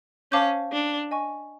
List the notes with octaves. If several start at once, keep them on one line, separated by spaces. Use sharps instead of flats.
C#4 C5 F5 A5 D6 G6
D4
D#5 G#5 C#6